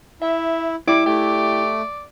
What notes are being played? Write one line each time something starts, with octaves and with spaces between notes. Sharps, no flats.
E4 E5
G3 E4 D6
A3 G4 D5